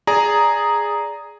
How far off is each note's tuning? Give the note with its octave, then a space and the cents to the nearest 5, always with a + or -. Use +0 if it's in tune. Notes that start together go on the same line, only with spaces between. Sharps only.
G#4 +0 D5 -15 A#5 +0